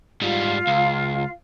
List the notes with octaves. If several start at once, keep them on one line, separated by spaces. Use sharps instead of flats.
G#2 G3 F4 F5
C#2